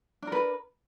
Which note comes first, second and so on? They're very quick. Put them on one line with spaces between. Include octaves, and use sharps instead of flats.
D4 A#4 B4